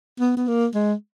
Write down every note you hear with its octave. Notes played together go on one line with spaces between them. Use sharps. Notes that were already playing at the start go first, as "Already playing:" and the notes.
B3
B3
A#3
G#3